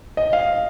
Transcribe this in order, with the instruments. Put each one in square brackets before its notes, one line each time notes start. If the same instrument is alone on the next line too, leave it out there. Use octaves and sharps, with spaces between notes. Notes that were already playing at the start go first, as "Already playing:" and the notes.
[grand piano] D#5
F5